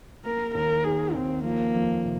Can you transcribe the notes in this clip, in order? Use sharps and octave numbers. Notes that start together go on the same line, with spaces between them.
A#3 A#4
D#2 A#4
D#3 G#4
D#2 C4
F3 A#3
F2
C3